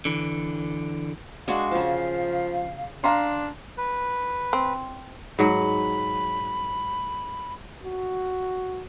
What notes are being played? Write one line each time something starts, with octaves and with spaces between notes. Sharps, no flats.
D3 E3
G#3 D4 F#4 F5
C#3 F3 A5
D4 F5 A#5 C6
B4
C4
G#2 F#3 B5
F#4